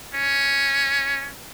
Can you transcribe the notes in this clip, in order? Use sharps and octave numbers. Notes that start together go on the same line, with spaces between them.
C#4